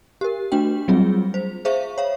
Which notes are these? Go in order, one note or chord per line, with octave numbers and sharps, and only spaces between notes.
G4 A#4
A3 D4 F#4 G5
F#3 G3 C4 F4 G#4
C5
G#4 C5 E5 F5 C#6
C#5 F5